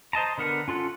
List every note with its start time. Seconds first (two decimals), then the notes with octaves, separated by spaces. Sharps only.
0.13 C5 D#5 A5 A#5
0.38 D3 B3 A#4 F#5
0.68 C#4 F4 A4 F#5